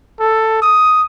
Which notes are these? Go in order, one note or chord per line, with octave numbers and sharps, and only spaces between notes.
A4
D#6